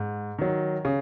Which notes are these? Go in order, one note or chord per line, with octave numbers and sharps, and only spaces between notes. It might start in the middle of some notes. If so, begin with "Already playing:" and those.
Already playing: G#2
D#3 F#3
C#3